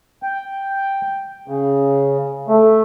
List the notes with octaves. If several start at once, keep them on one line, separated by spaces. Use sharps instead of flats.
G5
C#3
A3